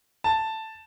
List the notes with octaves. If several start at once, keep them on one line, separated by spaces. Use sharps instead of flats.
A5